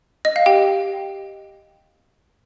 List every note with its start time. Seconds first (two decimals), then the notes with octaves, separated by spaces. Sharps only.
0.25 D#5
0.36 F5
0.46 G4 G5